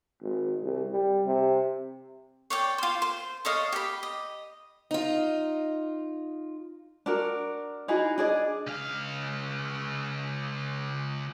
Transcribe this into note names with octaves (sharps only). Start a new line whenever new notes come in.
G#1
C2
G3
C3
C#5 D5 G5
F4 C5
C5
A4 C#5 D#5 F5
G4 B5
D#5
D#4 F4
D4 F#4 A#4
D#4 E4 F#4 G#4
D4 G#4 D5 D#5
C#2 F5